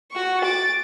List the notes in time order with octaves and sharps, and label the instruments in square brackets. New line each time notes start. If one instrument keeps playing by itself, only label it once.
[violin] F#4 C#6
D6 A6